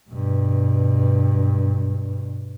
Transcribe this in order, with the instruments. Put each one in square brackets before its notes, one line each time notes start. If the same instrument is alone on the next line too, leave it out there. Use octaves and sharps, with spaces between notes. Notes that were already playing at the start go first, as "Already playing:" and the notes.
[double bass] G2 B2